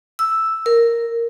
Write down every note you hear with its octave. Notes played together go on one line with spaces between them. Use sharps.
E6
A#4